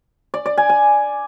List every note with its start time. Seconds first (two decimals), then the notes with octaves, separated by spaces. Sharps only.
0.34 D5
0.46 D5
0.58 G#5
0.69 G#5